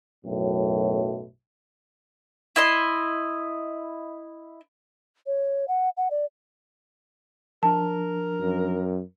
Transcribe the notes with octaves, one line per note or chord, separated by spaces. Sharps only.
B1 F#2 A2
E4 D#5 C6
C#5
F#5
F#5
D5
F3 D4 A#4 A5
F#2